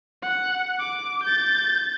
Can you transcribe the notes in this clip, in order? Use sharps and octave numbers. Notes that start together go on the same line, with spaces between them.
F#5
D6
G6 A6